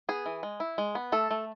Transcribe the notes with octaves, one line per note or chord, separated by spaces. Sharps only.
B3 G#4
E3
G#3
E4
G#3
B3
A3 A4
A3